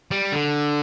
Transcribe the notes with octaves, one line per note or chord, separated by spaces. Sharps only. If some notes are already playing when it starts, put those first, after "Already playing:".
G3
D3